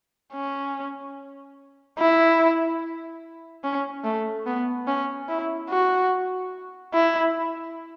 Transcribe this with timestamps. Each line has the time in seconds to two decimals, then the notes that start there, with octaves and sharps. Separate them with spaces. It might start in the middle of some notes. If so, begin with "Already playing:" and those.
0.33 C#4
1.99 E4
3.64 C#4
4.04 A3
4.46 B3
4.87 C#4
5.29 E4
5.69 F#4
6.94 E4